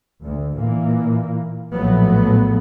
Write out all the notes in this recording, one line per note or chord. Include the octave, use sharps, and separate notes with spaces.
D2
A#2 E3 A#3
A#1 A2 F3 F#3 A3 B3